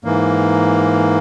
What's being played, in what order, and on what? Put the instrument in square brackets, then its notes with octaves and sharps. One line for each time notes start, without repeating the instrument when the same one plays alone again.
[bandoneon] G#2 E3 A#3